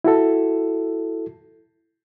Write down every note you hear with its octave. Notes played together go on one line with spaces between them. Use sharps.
E4 F#4 A4